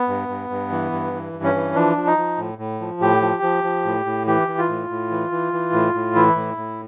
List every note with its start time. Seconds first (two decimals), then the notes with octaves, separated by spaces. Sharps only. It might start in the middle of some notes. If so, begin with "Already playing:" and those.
Already playing: B3
0.08 G2
0.28 G2
0.50 G2
0.71 E3
0.92 G2
1.13 E3
1.33 G2
1.44 C#4
1.54 E3
1.75 F3 D4
1.96 F3
2.07 D#4
2.17 F3
2.37 A2
2.58 A2
2.81 F3
3.01 A2 G4
3.21 F3
3.43 F3
3.64 F3
3.85 A2
4.06 A2
4.27 E3 G4
4.48 E3
4.58 F4
4.69 A2
4.90 A2
5.11 E3
5.31 E3
5.53 E3
5.73 A2
5.94 A2
6.15 E3 E4
6.36 A2
6.57 A2